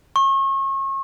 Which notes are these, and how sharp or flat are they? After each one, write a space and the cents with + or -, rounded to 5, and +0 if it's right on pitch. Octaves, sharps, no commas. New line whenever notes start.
C#6 -35